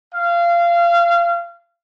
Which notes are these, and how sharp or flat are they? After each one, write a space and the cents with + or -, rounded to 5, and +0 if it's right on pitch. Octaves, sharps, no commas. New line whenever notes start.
F5 -25